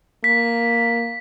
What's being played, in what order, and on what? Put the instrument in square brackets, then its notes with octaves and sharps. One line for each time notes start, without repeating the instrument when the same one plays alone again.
[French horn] A#3 [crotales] B6